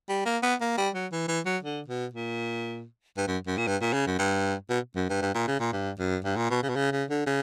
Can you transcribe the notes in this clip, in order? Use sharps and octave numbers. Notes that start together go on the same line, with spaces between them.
G3
A#3
B3
A#3
G3
F#3
E3
E3
F#3
D3
B2
A#2
G2
F#2
F#2
A#2
G2
A#2
C#3
F#2
G2
B2
F#2
G2
G2
A#2
C#3
A#2
G2
F#2
G2
A#2
B2
C#3
B2
C#3
C#3
D3
C#3